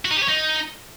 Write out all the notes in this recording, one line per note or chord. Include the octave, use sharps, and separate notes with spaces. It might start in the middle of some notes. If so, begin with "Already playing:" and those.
F#4
D#4
G4
C#5
D#4